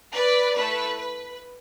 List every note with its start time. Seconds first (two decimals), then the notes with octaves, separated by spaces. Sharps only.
0.13 B4 D5
0.55 A3 E4 A4 B4
0.98 B4